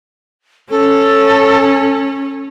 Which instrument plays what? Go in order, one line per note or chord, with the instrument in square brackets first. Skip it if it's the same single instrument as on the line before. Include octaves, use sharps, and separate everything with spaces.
[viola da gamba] C#4 [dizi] A4